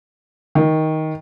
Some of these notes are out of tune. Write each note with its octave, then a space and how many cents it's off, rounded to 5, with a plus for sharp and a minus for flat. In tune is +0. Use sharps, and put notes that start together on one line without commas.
D#3 +15